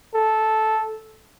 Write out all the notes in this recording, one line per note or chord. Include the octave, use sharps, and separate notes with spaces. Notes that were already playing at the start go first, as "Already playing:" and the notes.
A4